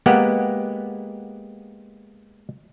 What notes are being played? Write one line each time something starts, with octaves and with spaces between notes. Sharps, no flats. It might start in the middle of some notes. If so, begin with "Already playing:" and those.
G#3 A#3 B3 G4 F#5